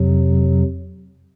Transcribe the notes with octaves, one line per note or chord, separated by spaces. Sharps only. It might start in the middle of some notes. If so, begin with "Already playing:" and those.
Already playing: F2 C3 F#3